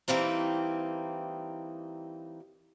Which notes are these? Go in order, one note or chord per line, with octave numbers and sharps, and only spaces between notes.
E3 G3 A#3 C4 D#4